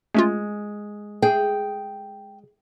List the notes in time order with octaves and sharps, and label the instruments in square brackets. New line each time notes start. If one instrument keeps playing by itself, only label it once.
[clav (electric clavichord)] G#3 [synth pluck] A3 C#4 F4
[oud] G#4 [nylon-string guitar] G5